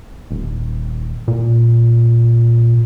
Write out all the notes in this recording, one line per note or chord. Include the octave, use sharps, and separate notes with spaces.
D#1
A#2